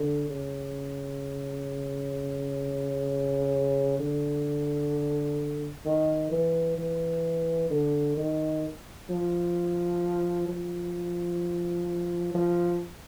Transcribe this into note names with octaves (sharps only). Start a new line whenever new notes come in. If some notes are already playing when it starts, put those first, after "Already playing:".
Already playing: D3
C#3
D3
D#3
E3
E3
D3
D#3
F3
F3
F3